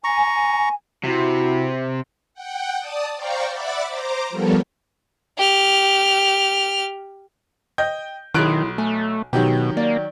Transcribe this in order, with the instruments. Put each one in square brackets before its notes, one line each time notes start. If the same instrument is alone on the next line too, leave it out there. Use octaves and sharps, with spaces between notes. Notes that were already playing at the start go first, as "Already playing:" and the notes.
[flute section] G#5 [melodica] A#5 C#6
[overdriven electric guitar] C3 [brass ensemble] E4 F#4
[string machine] F#5 G5
D5 A5 D#6
C5 D5 F5 G5 A#5 C#6
D5 E5 F#5 B5 D6 A6
C5 A#5 D6
F3 G3 B3 A4 A#4 C#5
[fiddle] G4 F6
[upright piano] D#5 G5 G6
[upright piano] B1 F#6 D7 [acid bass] D#3 [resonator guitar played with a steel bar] E4 F4 G#4
[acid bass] A3 [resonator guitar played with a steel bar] G#5
[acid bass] B2 [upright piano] D#3 F#3 G4
[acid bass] A#3 [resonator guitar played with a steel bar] D5